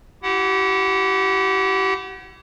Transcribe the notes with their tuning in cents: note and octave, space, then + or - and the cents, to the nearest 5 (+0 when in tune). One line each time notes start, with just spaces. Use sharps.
E4 +25 G4 -30 F#5 +0